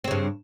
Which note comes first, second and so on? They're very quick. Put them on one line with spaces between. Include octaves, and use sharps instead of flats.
C4 C#3 G2